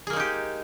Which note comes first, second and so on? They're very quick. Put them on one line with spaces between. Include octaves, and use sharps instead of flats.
G#4 A#3 G#3 D#4 G4